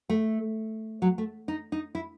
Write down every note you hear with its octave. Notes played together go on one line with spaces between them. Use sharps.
A3
F#3
A3
D#4
D#4
E4